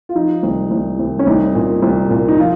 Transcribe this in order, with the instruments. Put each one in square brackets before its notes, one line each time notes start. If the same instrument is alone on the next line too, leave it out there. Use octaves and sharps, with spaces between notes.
[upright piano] F4
F3 D#4
C2
C2
C2
C#4
C2 D#4
A#2
C2
A#2
D#4
F3 F4